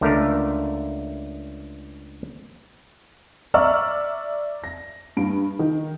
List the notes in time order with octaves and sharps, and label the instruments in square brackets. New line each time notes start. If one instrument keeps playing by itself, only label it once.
[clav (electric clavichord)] C#2 D3 A3 A#4
[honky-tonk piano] D5 E5 A#5 C#6 E6 F6
A#6
G2 D7
D#3